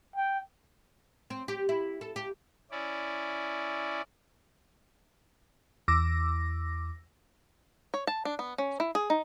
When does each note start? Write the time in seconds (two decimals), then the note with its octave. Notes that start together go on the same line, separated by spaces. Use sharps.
0.16 G5
1.30 C4
1.48 G4
1.69 E4
2.01 A4
2.16 G4
2.71 C#4 E4 D5
5.88 E2 D6 E6 A#6
7.94 C#5
8.07 A5
8.25 D4
8.39 B3
8.58 C#4
8.80 E4
8.95 G#4
9.10 D#4